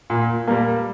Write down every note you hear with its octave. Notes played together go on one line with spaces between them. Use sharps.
A#2
G3 A#3